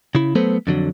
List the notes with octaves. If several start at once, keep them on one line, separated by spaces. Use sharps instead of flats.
C#3 E4
F#3 A3 B3 A4 C5
F2 D3 F#3